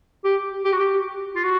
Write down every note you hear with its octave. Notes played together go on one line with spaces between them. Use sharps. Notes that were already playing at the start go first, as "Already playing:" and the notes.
G4
G4
F#4
G4
F4
F#4